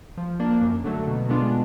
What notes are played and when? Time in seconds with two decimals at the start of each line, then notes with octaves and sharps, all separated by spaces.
0.17 F3
0.40 A#3 D4
0.62 F#2
0.84 D3 F#3 A3
1.07 B2
1.29 G#3 B3 D4 F4